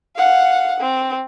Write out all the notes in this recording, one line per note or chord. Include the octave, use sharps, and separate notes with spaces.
F5 F#5
C4